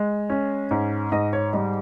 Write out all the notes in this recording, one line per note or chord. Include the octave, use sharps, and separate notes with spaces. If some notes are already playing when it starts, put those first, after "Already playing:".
Already playing: G#3
C#4
G#2
G#2 D#5
C#5
G3 D#5